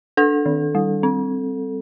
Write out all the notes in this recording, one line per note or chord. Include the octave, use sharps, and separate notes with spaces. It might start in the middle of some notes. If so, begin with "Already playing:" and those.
D4 A4
D#3
G3
C4